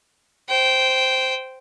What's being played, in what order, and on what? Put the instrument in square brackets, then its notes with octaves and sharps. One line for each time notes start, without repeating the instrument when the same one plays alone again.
[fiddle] C5 G5